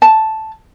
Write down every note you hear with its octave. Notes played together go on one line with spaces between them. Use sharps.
A5